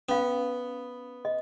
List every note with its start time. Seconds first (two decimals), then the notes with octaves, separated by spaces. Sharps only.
0.09 B3 C#4 F5
1.25 D#5